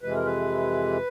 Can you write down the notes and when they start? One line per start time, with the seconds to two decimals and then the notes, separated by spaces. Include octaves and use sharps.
0.03 F2 C3 E3 G#3 B4
0.15 A#4
0.26 B4